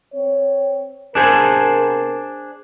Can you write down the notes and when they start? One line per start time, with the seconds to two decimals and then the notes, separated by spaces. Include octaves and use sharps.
0.13 C4 C#5
1.15 C3 B3 D4 G#4 A#4 C5